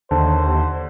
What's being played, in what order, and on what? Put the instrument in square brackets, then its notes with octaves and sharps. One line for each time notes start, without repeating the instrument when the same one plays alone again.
[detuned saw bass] D#2 [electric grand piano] D3 [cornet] C5 [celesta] A5